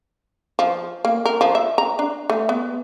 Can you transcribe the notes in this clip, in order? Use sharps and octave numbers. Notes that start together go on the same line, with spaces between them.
F3
A#3
A#4
F3
E5
A#5
D4
A3
B3